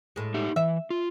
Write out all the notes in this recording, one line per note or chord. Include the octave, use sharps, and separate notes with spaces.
A2 G#3
D#4 G4 E5
E3 E5
F4